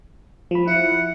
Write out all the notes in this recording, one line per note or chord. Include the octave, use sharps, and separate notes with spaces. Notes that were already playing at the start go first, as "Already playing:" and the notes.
F3 B5
E4 F#5